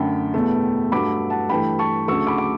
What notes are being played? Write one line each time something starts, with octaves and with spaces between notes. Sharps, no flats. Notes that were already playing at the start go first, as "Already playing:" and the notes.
Already playing: F#2 D3 A3 G5 B5
E2 B2 A3
G2 F#3 A3 B5 D6
F#5 A5
G2 E3 A3 G5 B5
A5 C#6
D2 C#3 F#3 A3 C#6 E6
B5 D6
D6